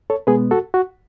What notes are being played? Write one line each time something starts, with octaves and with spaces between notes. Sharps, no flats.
A4 C#5
B2 G#3 B3 G#4 B4
F#4 A4
F#4